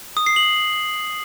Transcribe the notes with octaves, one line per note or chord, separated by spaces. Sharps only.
D#6
C7
F#7